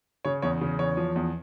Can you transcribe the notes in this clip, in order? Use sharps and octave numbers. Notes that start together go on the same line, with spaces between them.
C#3 C#5
E2 C#5
C#3
E2 C#5
F3
E2